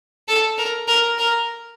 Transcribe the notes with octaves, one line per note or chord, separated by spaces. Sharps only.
A4
A#4
A#4
A#4